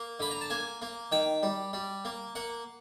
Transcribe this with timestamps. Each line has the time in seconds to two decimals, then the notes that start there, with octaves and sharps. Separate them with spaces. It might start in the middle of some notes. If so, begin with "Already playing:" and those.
Already playing: A#3
0.20 D3 B5
0.31 A#5
0.41 A5
0.50 A#3 G#5
0.82 A#3
1.12 D#3 G5
1.43 G3
1.73 G3
2.05 A#3
2.35 A#3 F#5